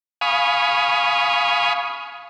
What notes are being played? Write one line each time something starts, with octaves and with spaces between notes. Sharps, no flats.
F5 G#5 B5 C#6 D#6